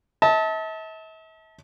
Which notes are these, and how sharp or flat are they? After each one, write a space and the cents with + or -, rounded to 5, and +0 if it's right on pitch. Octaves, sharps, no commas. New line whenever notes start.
E5 -45 A5 +0